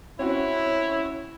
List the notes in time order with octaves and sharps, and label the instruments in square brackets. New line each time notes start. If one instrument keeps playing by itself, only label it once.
[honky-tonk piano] C4 C#4 F#4 [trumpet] E4 [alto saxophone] C#5